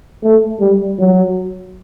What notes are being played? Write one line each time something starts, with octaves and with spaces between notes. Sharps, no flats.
A3
G3
F#3